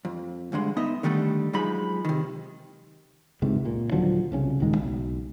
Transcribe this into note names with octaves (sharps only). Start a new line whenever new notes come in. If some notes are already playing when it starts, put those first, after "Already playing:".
F2
D2 G2 D3 G#3
B3 D#4 D#5 E5
D3 D#3 G3 A3 A4
F#2 F3 G#3 D#4 B5
C3 D#3
G1 C#2 G#2 C3
A#2
D#1 D3 F3 F#3
C2 C#3 C#4
D#1 C#2 D#3 G#3
B1